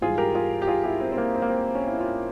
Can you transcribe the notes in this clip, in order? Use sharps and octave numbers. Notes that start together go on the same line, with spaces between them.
G#2 E3 G3 F4 G#4
G4 A#4
F4 G#4
G4
F4 G#4
E4 G4
C4
C4
A#3
C4
A#3
C4
C#4
E4
C#4 F4